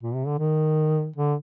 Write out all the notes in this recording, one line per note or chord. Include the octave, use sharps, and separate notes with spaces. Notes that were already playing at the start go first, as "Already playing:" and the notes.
A#2
C3
D3
D#3
D3